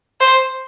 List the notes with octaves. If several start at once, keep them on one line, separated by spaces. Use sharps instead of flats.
C5